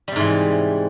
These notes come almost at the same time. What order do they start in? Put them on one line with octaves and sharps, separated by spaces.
G3 C3 G#2 E3